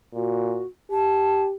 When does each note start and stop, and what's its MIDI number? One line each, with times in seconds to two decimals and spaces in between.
0.14 0.62 46
0.14 0.65 66
0.91 1.56 67
0.91 1.42 81